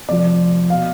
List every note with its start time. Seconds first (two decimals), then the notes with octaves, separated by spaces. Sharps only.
0.08 F1 F2 F3 D5
0.69 B2 F5